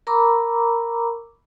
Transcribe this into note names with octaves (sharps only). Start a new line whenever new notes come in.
A#4 A#5 B5 C#6 D6 E6